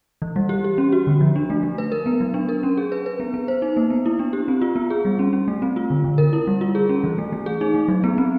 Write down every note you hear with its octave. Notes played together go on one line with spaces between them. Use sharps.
E3
G3
G4
G4
C#4
F#4
D3
F3
D4
A3
A3
B4
A#4
B3
F#3
D4
A#4
C#4
G#4
B4
B4
B3
B3
C5
D#4
A#3
B3
E4
D4
G4
C4
F4
B3
G#4
G3
C#4
C#4
A3
C4
F4
D3
D3
A#4
E4
G3
F4
G#4
C#4
E3
A3
A3
G#4
D#4
A3
F#3
B3
C4